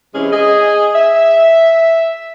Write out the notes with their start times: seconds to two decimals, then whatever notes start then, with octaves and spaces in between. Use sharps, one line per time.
0.15 C3 E3 G#3 C#4 E4 G#4
0.32 G#4 D#5
0.96 E5